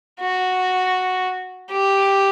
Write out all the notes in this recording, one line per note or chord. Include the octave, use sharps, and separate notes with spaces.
F#4
G4